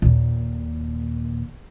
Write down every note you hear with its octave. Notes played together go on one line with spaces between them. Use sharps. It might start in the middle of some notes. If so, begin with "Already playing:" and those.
D#2 A#2